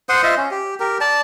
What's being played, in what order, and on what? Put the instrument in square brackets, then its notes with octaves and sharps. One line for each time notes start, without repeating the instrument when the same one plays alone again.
[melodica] C5 F#5 C6 D#6
F4 C5 D#5 E5
C#4
G4
G4 A#4
D5 A5